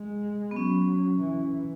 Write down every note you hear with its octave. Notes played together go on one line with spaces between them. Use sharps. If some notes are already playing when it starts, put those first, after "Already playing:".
Already playing: G#3
B3
F#3 C#4
E3